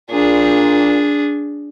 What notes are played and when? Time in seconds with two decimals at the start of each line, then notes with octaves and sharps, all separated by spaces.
0.11 A#2 D4 G#4